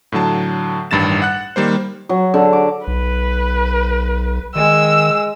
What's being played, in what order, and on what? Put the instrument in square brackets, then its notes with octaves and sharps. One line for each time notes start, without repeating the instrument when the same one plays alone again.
[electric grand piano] A2 D3 F#3 A5
A1 G2 D#3 A6 E7
F#5 F#6
D#3 G3 A#3 C5
[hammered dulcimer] F#3
D3
D6
[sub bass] B1 [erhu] B4
[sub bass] D#3 [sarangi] G#3 [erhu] E6